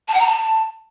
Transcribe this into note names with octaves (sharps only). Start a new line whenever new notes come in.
A5
F#5
A#5
A5